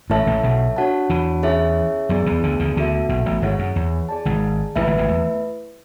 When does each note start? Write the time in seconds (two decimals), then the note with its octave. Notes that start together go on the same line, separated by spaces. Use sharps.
0.10 A1 A2 E4 A4 C#5 E5 A5
0.27 A1 A2
0.43 B1 B2
0.76 D4 F#4 C#5 F#5 A5
1.09 E2 E3
1.43 C#4 E4 G#4 C#5 E5
2.09 F#2 F#3 B3 E4 G#4 D5
2.26 E2 E3
2.43 D2 D3
2.59 D2 D3
2.76 D2 D3 B3 F#4 A4 E5
3.09 B1 B2
3.26 A1 A2
3.42 G#1 G#2 E4 G#4 C#5 F#5
3.59 F#2
3.76 E2
4.09 G#4 D5 A5
4.25 G#1 G#2
4.76 A1 A2 A3 E4 B4 E5
4.87 G#1 G#2
4.98 G#1 G#2
5.09 E2